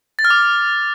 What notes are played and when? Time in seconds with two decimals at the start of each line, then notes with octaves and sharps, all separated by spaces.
0.19 A6
0.25 F6
0.30 D6